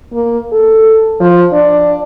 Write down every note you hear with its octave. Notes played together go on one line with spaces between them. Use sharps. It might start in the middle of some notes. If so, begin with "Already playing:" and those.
A#3
A4
F3
D4